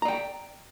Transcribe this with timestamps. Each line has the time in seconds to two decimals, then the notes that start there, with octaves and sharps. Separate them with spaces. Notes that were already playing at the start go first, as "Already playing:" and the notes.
0.02 A#5
0.05 D5
0.08 G5